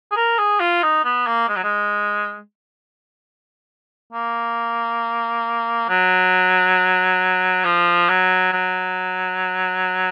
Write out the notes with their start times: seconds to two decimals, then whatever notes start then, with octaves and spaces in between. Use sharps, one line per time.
0.11 G#4
0.16 A#4
0.38 G#4
0.60 F4
0.83 D#4
1.04 B3
1.27 A#3
1.48 G#3
1.56 F#3
1.63 G#3
4.12 A#3
5.89 F#3
7.65 F3
8.09 F#3
8.53 F#3